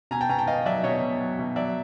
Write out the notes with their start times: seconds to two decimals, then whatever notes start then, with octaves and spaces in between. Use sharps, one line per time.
0.11 B2 G#5 A#5
0.21 G5 A5
0.29 B2 G#5 A#5
0.38 G5 A5
0.47 B3 D#5 F5
0.66 F#3 D5 E5
0.84 B2 C#5 D#5
1.02 B2
1.21 F#3
1.39 B2
1.56 F#3 D5 E5